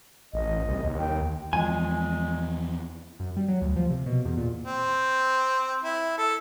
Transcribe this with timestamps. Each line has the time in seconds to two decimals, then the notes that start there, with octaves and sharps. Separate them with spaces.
0.33 A1 D#5
0.68 C2
0.84 D#2
0.99 G5
1.53 E2 F3 G#3 G#5
3.20 F#2
3.37 G3
3.48 F#3
3.62 D2
3.76 F3
3.90 C3
4.06 B2
4.25 E2
4.37 A#2
4.65 C4
5.84 E4
6.18 A4